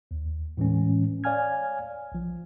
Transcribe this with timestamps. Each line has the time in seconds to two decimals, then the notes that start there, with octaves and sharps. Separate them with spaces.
0.11 D#2
0.57 A2 E3 G#3 C#4
1.24 C#5 D5 F5 G#5 F6 G#6
2.12 A#1 F3